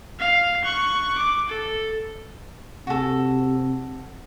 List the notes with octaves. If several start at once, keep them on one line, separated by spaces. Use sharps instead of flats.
F5
C#6 F#6
D6
A4
C3 F#4 A4